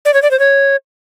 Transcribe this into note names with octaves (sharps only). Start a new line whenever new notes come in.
D5
C#5
D5
C5
C#5